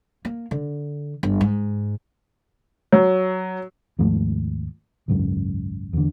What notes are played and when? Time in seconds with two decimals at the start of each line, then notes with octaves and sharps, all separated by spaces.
0.25 A#3
0.51 D3
1.23 G1
1.41 G#2
2.92 F#3
3.99 D#2 G#2 F3 A3
5.08 G#1 C#2 F#2
5.93 E2 D3